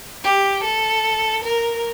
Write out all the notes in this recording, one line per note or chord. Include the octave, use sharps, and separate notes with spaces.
G4
A4
A#4